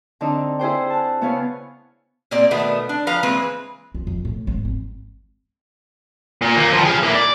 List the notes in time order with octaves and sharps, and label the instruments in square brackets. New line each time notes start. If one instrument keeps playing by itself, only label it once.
[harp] D3 C4 D4 D#4
E4 G#4 C5 G5
A5 F#6
C#3 B3 E4 B4 C#5 F5
[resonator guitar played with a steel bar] A#2 A#3 C4 D5
B2 D#3 A3 B3
D4
F3 B4 F5 A#5
E3 G#3 A#3 C4 B4
[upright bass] F4
F2
A2
G#1
C4
[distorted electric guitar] A#2
D#3 A#3
F3 G3
G#4 F5
A#3 E4
D5